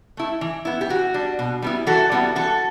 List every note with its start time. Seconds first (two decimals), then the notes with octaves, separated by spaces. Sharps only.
0.17 A3 E4
0.41 E3
0.65 B3 E4
0.81 G4
0.89 E3 F#4
1.14 G3 D4
1.39 B2
1.62 G3 B3 E4
1.87 E3 F#4 A4
2.12 G3 B3 E4
2.36 E3 F#4 A4